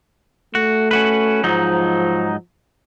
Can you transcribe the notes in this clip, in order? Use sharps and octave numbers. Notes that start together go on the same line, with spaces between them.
A3 F#4
C#4 F#4 B4
G#2 F3 F#3 D#4